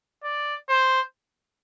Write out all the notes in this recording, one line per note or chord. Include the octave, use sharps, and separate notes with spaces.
D5
C5